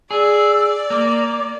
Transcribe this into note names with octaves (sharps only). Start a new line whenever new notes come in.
G#4 D5 E6
A#3 D6